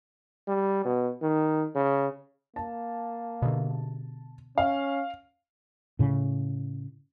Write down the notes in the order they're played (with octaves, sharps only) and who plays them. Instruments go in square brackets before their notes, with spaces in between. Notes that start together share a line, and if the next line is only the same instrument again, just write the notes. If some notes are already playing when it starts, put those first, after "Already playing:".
[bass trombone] G3
B2
D#3
C#3
[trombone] A#3 [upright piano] A5
[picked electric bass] B2 D3
[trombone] C#4 [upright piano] F5
[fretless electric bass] A2 C#3